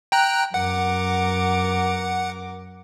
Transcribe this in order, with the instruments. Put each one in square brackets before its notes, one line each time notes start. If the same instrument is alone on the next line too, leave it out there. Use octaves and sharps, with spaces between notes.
[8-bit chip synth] G5 A#5 F#6
[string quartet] F#2 A#4 D6 [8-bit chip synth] F#5